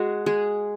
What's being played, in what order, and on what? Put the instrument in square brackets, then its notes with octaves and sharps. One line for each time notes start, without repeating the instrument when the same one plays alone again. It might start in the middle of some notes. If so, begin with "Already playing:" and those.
Already playing: [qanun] G#3 F#4 G#4
G#3 G#4